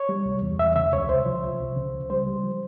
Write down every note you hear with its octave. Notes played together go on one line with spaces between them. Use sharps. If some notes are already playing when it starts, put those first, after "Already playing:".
Already playing: C#5
G3
C2
E2
E2 E5
C#3 E5
C#2 C#5
C2 C5
F3
C2
C2
C#3
C#2
G3 C5
G3
F3